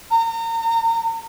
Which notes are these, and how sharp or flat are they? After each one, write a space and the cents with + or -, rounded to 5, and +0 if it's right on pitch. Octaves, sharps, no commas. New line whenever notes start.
A#5 -35